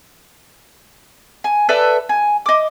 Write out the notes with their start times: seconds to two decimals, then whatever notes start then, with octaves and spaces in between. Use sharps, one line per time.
1.44 G#5
1.69 A4 B4 D5 E5
2.09 G#5
2.46 D#5 D6